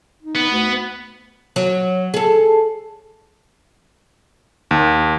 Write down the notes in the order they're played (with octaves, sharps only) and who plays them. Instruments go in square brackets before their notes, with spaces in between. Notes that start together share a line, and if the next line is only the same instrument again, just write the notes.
[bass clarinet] D#4
[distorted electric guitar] B3
[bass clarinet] D2
[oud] F#3
G#4 A4
[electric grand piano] D#2